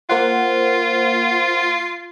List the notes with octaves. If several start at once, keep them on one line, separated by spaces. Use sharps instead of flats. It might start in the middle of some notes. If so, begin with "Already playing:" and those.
A#3 F4 C5 F#5